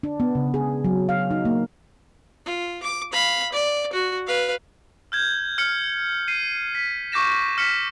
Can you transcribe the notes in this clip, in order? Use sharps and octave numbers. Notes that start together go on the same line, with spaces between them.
D4
B3
C#3
G#4
F#3
F5
D#4
A#3
F4
D6
F5 B5
D5
F#4
B4 F5
F6 G6 G#6
F6 C#7
C7 D#7
B6
C#6 D6 G6 A#6 E7
F6 B6 C#7